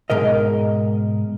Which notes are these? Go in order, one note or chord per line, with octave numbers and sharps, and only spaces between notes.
G#2 B2 A#4 D#5